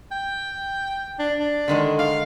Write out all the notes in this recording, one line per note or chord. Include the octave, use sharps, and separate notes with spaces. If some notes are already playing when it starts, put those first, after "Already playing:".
G5
D4
D4
D3 D#3 G#3
D5 F5